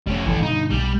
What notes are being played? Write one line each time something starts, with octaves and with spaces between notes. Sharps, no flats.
F1 G3 A3 C#4
F1 A#1 E3 A4
G2 B2 D3 D#4
B1 G3